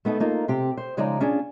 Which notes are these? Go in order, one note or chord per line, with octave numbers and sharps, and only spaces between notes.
A3 B3 D#4 A4
A#3 D#4 F4
C3 C4 G4
C5
C#3 F3 G#3 D#4 D5 A#5
C#4 D4 F4 G#4